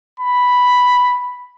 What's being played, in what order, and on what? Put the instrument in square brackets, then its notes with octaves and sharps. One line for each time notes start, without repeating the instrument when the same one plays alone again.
[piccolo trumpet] B5